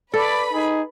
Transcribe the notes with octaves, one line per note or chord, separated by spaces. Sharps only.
A4 B4 D5 B5
D#4 G#4